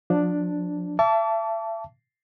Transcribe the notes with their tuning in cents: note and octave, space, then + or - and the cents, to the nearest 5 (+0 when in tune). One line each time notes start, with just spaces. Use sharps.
F3 +30 D4 +0
E5 +35 A5 +0 D6 -40